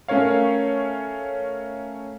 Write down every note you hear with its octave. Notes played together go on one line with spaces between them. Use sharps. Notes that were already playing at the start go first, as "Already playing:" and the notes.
A3 C#4 A#4 C#5 F5